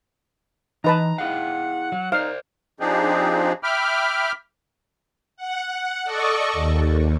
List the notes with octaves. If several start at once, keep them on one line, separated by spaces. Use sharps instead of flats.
E3 D#4 B4 A5 A#5
E4 G#4 F5 F#5
F#3
D#4 C5 D5 F5
F3 C4 D4 D#4 G4 G#4
E5 G5 B5 D6 F6
F#5
A4 D5 D#5 C#6
D#2